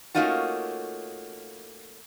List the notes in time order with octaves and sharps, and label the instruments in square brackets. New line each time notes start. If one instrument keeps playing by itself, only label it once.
[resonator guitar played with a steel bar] A3 A#3 C#4 D#4 F4 F#4